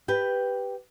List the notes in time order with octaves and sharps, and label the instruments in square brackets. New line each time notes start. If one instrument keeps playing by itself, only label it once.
[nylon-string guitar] G4 B4 G5